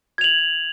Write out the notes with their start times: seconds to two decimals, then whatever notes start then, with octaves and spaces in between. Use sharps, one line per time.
0.18 G#6
0.21 F7
0.24 F#7